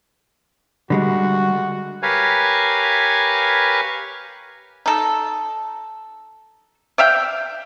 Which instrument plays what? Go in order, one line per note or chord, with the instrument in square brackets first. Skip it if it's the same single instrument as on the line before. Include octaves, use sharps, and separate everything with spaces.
[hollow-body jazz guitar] D3 G3 G#3 [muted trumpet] F#4
[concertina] G4 A#4 B4 C#5 F5 G#5
[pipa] D#4 A4
D5 E5 F5 G5